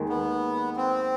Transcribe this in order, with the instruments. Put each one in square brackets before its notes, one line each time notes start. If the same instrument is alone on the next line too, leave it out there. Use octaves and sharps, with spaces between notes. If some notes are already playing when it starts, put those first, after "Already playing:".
Already playing: [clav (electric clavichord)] D#2 D#3 G#3
[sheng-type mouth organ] B3
C4